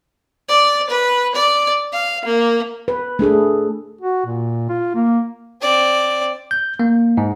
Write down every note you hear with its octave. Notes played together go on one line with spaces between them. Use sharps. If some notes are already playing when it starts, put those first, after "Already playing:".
D5
B4
D5
F5
A#3
B4
A3 D4 G#4 A4
F#4
A#2
F4
A#3
C4 D5
G6
A#3
G#2